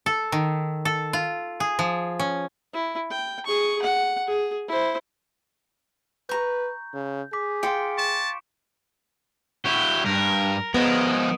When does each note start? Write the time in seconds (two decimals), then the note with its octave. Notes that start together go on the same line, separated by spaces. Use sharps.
0.06 A4
0.32 D#3
0.85 A4
1.13 F4
1.60 G#4
1.79 F3
2.19 C#4
2.73 E4
3.10 G5
3.46 G#4 C#6
3.82 F#5
4.27 G#4
4.68 E4 C5
6.29 B4 A#5 C#6 G6
6.94 C#3
7.33 G#4 D6 B6
7.63 F4 G5 C6 C#7 D7
7.98 A5 C#6 E7
9.66 E4 F#4 G4
10.06 G2 A#4
10.74 F3 G#3 B3 A#4 D#5